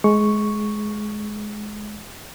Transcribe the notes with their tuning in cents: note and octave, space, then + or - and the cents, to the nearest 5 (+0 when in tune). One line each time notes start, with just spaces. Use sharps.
G#3 +20 C#6 +0